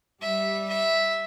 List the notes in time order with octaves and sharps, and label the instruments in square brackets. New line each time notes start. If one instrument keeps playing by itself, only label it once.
[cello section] G3 [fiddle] E5
[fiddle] E5